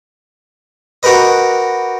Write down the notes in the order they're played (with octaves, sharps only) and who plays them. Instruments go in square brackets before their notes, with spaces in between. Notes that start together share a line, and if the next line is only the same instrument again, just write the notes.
[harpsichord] F#4 G4 A#4 B4 D#5